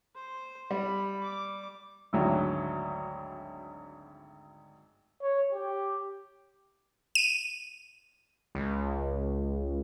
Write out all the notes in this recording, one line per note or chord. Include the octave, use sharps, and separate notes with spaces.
C5
G3 B5
D6
G#1 D2 F#3
C#5
G4
D#7
C#2